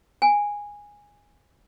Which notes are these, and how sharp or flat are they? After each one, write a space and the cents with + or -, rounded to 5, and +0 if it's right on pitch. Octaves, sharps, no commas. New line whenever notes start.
G#5 -10